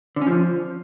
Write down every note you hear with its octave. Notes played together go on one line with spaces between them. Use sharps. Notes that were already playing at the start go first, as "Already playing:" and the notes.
D3
C#4
F3